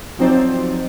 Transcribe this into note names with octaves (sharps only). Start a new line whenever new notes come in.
F3 F#3 C4 D#4 C5 D5